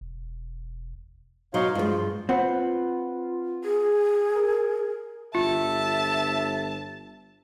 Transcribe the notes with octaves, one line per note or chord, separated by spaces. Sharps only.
E1
B2 F#3 D#4 C#5 F5 C6
G2 F3 G#3 F4
C4 F4 B4 F#5
G#4
A#4
G1 F4 E5 A5